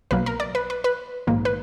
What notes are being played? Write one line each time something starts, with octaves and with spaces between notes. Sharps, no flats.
B1 B2 F#3 A#3 B4
A#4
D5
B4
B4
B4
A#1 G#2 D#3 A#3
B4